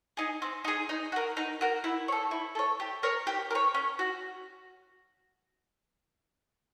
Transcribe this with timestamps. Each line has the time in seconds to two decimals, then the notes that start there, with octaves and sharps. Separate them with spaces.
0.17 D#4 G#4
0.42 C4
0.65 D#4 G#4
0.89 D#4
1.12 F#4 A#4
1.37 D#4
1.61 F#4 A#4
1.84 E4
2.08 C#5
2.12 A4
2.31 E4
2.55 A4 C#5
2.80 G4
3.03 A#4 C#5
3.27 G4
3.51 A#4
3.55 C#5
3.74 C#4
3.99 F#4